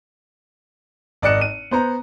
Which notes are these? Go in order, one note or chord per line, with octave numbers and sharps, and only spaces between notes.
G#1 D5 D#5 F#6 C#7 E7
D#7
B3 C5 A#5